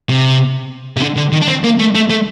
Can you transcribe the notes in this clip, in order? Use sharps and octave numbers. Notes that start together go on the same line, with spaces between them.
C3
C3
D3
D3
D#3
D4
C4
A#3
A3
A3
A3